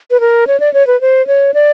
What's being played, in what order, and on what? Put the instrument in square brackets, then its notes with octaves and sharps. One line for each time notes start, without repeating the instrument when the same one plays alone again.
[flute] B4
A#4
C#5
D5
C#5
B4
C5
C#5
D5